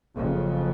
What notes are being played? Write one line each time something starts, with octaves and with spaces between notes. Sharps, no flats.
F#1 F2 C#3